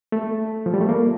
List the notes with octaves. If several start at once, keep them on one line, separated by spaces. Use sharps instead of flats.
A3
F3
G3
A3
A#3